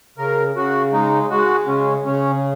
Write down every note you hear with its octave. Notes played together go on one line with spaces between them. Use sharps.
C#3 A#4
C#3 F#4
G#3 D#4
G#3 F#4
C#3 C#4
C#3 C#4